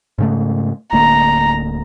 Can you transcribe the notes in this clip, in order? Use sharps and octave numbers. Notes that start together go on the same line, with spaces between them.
G#2 C#3 A3
D1 D2 A#3 A#5